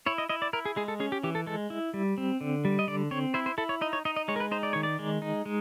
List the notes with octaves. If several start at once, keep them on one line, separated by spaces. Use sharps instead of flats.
E4 C#5
D#5
E4 D#5
D5
E4 A#4
G#4
G#3 G#4
A4
C#4 G#4
G4
E3 G4
A4
G#3 A4
E4
G3
C4
D3
G3
D#5
D3 D5
C4 C#5
E4 C5
C5
E4 A4
C#5
D#4 D#5
C#5
D#4 D#5
D#5
G#3 C#5
A#4
B4
D#4 C5
D5
D#3 C#5
D5
G#3
D#4
G#3